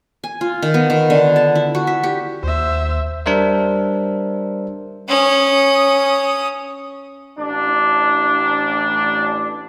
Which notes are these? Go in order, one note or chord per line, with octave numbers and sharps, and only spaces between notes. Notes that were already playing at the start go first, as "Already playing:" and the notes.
G#5
F4
D#3
B3
D#3
D3
A5
E4
F#4
E5
G4
D#2 C5 E5
G3 D4 A#4 C5 E5
C#4 D#6
A1 D4